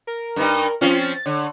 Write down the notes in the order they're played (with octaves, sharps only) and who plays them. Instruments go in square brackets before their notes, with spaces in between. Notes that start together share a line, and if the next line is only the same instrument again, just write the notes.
[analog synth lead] A#4
[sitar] G2 D#4
[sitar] F3 C4 C#4 [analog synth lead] F4
[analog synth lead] A6
[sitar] D3 [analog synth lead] C#5